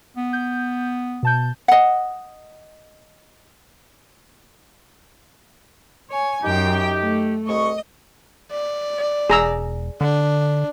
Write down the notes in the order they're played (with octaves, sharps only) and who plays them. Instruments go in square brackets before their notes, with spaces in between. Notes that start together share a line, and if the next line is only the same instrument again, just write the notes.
[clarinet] B3
[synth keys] G6
B2 A5 G6
[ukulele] D#5 F#5
[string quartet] C#5 G#5
[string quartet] F#2 G5 [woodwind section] D#4 G4
[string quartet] A3
[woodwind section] C2 C#6 [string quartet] D#5
[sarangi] D5
[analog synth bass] E1 [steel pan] G#4 A#5 E6
[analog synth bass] D3 [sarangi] D4